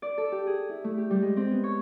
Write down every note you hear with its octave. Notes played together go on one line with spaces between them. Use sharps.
D5
A4
G4
G#4
E4
A3
G4
G3
G#3
C4
B3
C#5